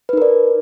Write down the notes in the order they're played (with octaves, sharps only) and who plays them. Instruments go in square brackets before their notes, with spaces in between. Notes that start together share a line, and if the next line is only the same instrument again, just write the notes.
[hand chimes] B4
D#4
A#4
D5